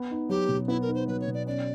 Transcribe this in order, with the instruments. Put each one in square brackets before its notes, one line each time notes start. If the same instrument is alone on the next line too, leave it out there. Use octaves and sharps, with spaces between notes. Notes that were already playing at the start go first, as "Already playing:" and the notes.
Already playing: [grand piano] B3
D#4
[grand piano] F#3 [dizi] G4
[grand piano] B2
[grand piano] B3 [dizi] E4
[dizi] A#4
[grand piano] D#4
[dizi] C5
[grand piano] F#3 [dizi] B4
[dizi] C#5
[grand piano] B2
[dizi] D5
[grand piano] C#4 [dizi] D5